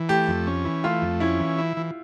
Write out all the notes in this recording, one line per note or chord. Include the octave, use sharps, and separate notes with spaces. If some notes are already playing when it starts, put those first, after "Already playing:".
Already playing: E3
A3 G4
F2
C#4
E3
A3 F4
F2
C#4 E4
E3
E4
E3